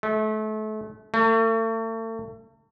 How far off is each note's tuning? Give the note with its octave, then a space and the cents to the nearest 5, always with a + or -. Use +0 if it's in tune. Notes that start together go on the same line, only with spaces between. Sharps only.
A3 -30
A3 +40